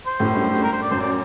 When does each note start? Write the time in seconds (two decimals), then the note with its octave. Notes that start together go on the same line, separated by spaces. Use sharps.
0.06 C5
0.20 F#2 A2
0.34 G2
0.63 A#4
0.72 C5
0.82 D5
0.91 F#2 C5
1.00 D5